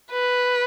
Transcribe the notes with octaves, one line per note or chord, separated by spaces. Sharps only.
B4